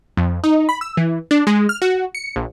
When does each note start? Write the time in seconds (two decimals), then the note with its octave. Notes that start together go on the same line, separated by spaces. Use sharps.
0.17 F2
0.44 D#4
0.69 B5
0.81 E6
0.97 E3
1.31 D4
1.47 G#3
1.69 F6
1.82 F#4
2.15 C#7
2.36 A#1